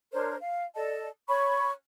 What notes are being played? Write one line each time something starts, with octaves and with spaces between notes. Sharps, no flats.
D4 A#4 C5 C#5
F5
A4 D5 D#5 A5
C#5 B5 C#6